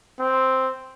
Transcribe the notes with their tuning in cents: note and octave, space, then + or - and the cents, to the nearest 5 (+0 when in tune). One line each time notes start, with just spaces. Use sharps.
C4 +0